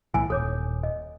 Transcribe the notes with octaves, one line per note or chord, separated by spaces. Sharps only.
B1 A2 E3 G#5
D#1 A4 C#5 D6
D#5